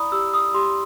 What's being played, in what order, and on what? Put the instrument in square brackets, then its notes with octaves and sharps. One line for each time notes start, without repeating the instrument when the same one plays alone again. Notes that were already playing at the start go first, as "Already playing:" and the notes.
Already playing: [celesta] E4 D5 A#5 B5 D#6
G4 E6
D#6
G4 C6